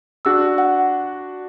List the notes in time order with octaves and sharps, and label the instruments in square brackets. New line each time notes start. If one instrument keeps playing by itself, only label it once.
[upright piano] D4 F#4 [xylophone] E6
[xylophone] F#5